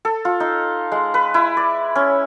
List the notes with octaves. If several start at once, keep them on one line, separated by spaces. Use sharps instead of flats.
A4
F4
D#4
G#3
B4
E4
D5
C#4